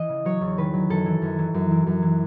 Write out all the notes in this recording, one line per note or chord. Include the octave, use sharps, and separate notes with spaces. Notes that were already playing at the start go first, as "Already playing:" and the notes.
Already playing: E3 D#5
C#3
F#3 C#5
E2
D#3 B4
F#3
F#2 A4
E3
F#2
E3
F#2
E3
F#2
E3